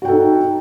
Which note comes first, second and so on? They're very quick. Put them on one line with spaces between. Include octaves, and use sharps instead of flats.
F#4 G5 A4 D#4